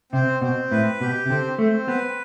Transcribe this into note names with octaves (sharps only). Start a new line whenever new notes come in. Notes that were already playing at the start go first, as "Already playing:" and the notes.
C3 C4
B2 C4
A2 B4
B2 G4
C3
D3 C4
A3 C4
B3 B4